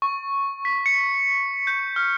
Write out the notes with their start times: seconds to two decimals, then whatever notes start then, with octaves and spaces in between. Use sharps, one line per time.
0.02 C#6
0.65 B6
0.86 C#7
1.67 G6
1.96 F6